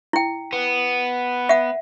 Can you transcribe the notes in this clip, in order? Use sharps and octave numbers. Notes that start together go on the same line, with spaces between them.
E4 G5
B3
E5 F#5